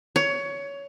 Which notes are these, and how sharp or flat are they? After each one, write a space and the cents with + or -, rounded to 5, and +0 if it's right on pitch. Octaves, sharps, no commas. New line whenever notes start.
C#5 +20